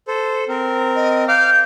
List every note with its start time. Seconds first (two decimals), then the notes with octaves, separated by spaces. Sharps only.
0.08 A4 C5
0.49 C4 A#4
0.96 D#5
1.28 F5 D6 F6 G6